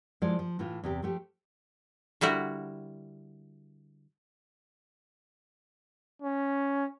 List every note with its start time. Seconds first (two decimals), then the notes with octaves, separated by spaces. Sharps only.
0.22 F3 G#3 E4 D5
0.39 F3
0.59 A2 E3 A3 F4
0.83 E2 C3 G4
1.02 F3 A3 G4
2.21 D3 G3 E4 F#4 A#4
6.22 C#4